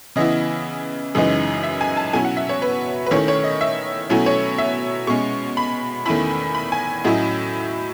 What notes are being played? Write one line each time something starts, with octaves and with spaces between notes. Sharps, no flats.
C#3 E3 B3 E4 D#5
F#2 C#3 E3 G#3 D#4
E5
G#5
A5
B2 F#3 C#4 E4 G#5
F#5
E5
C#5
B4
B4
D#3 A3 C#4 E4 C#5
C#5
D#5
E5
B2 F#3 A3 C#4 E4
C#5
E5
B2 G#3 C#4 C#6
B5
E2 D#3 A3 C#4 E4 B5
B5
G#5
A2 F#3 C#4 E4 D#5